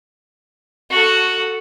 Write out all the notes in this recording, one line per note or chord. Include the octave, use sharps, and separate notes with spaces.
F#4 A4